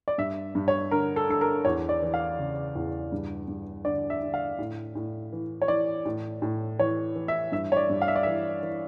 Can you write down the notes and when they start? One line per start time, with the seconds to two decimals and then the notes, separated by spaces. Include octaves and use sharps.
0.08 D5
0.18 G2 E5
0.55 G2
0.68 C#5
0.91 D3 A#4
1.16 A4
1.29 D3 A4
1.41 A#4
1.65 E2 C#5
1.89 D5
2.02 E3
2.14 F5
2.39 C#3
2.76 E2
3.12 G2
3.48 G2
3.85 D3 D5
4.10 E5
4.22 D3
4.34 F5
4.59 A2
4.95 A2
5.33 E3
5.62 C#5
5.68 E3 D5
6.05 A2
6.42 A2
6.79 E3 C#5
7.16 E3
7.28 E5
7.52 G2 E5
7.72 C#5
7.77 D5
7.90 G2
8.02 F5
8.08 E5
8.16 D5
8.23 E3 E5
8.63 E3